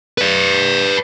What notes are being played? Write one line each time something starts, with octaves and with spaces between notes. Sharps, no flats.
B4 D5